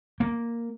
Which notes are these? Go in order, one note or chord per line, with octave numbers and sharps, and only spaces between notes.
A#3